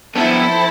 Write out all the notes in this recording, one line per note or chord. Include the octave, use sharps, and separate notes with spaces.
F3 B3 C4 D4 E4 A4